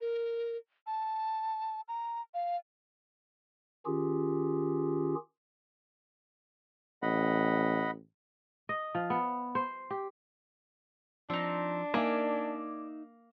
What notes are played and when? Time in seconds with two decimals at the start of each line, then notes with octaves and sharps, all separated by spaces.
0.01 A#4
0.87 A5
1.88 A#5
2.34 F5
3.86 D#3 C#4 F4 G4 G#4
7.02 A1 D#5 F#5 B5
8.69 D#5
8.95 F3
9.10 B3
9.55 C5
9.91 G4
11.30 F3 C4 D4 D#4
11.94 A#3 D#4 D5 E5 G#5